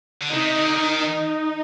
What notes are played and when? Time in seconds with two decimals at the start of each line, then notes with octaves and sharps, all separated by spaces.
0.21 D3
0.31 C3 D#4
0.55 D3
0.77 D#3
1.01 D#4